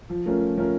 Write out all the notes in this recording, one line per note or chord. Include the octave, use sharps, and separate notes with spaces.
F3
A3 C#4 F4 A#4
F3
A3 C#4 F4 A#4